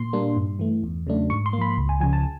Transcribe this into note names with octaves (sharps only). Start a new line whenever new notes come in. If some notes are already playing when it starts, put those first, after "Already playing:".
Already playing: A#2 C6
G3 A#3 D4
G2
E3 A3
E2
C#3 F#3 A3 D4
G#2 C#6
C6
A#3
F3 B5
C#2
G#5
C#3 F3 G#5
A5